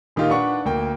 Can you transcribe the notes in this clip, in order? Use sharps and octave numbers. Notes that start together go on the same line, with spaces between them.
A#2 D#3 D#4 F4 G4
D4 B4 F#5 C#6
D2 A#3 G5